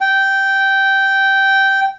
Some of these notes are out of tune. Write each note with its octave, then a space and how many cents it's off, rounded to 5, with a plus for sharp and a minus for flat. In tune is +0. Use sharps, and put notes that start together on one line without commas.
G5 -10